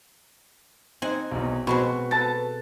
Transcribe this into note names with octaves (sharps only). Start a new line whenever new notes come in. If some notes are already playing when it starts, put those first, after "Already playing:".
C4 D#4 F#5 G#5
B1 E2
B2 G#3 C4 F#4 B5 C#6
A4 B4 A5 A6